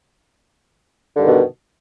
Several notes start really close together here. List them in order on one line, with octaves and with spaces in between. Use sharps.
D3 G2 D#3 B2